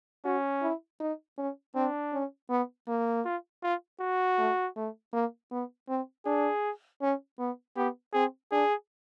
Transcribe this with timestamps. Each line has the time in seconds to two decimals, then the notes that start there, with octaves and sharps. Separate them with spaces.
0.25 C#4 F#4
0.62 E4
1.00 D#4
1.38 C#4
1.75 C4 D4
2.13 C#4
2.50 B3
2.88 A#3
3.25 F4
3.63 F4
4.01 F#4
4.38 A3
4.76 A3
5.13 A#3
5.51 B3
5.89 C4
6.26 D4 G#4
7.01 C#4
7.39 B3
7.76 B3 G4
8.14 C4 G#4
8.52 D4 G#4